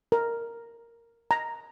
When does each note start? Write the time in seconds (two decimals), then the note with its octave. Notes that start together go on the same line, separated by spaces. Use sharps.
0.12 A#4
1.31 A#5